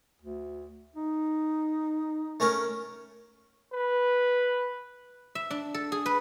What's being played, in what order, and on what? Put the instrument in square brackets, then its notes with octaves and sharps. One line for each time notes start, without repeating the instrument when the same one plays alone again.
[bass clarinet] D2
D#4
[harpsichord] A3 C#4 A#4
[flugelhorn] B4
[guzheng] E5
D4
A4
G#4
B4